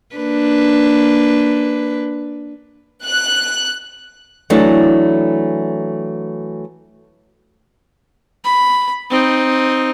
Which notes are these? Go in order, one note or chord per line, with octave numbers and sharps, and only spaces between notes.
A#3 D4 B4
F#6
E3 F#3 A3 D4
B5
C4 D#4